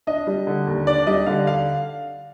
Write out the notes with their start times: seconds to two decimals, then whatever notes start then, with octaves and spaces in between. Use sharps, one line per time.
0.07 D4 D#5
0.27 G3
0.47 D3
0.67 D#2
0.87 D4 D5
1.07 G3 D#5
1.26 D3 F5
1.47 F5